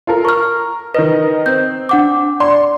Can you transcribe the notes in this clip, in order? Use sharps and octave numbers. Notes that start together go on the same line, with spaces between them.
F4 A4 A#4
A#4 C#6 F6
D#3 A#4 B4 D#5
C4 G6
D4 F#5 D6
D5 C6